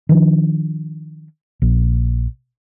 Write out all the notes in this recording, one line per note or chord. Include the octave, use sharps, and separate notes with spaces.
D#3 F3 D4
A#1